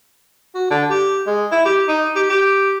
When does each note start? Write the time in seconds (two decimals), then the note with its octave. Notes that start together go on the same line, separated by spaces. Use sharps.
0.55 F#4
0.71 D3
0.90 G4
1.27 G#3
1.52 E4
1.65 G4
1.88 D#4
2.16 G4
2.29 G4